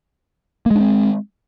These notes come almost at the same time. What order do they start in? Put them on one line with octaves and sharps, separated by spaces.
A#3 G#3 D4 C4